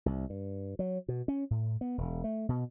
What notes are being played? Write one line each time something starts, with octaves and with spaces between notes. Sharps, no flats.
C2
G2
F#3
B2
C#4
A2
B3
E1
A3
B2